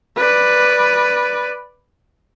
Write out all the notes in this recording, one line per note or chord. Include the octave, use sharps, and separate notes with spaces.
B4 D5